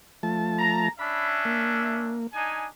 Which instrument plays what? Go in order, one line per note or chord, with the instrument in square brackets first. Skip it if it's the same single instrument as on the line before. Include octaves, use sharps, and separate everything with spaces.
[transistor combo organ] F3 A3 A5
[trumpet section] A#5
[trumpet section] C#4 D4 E5 [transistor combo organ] B5
[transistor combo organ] A#3
[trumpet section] D4 D#4 G#5